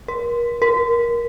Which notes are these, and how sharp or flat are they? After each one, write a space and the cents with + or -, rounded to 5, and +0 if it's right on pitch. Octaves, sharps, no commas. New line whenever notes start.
A#4 +35
A#4 +20